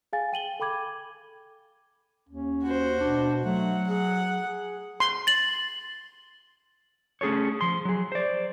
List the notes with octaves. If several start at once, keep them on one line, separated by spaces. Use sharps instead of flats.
G#4 F5 G#5 A6
G5 D#7 F#7 G7
A4 G5 B5 D6 G#6
D#2 C#4
F#4 C5
B2 D4
F#3 A3 F#5
G#4 F#5
G#4
C6
A6 F#7
A3 C#4 G#4 A4 C#5
F3 C6
F#3 G#4
C5 D5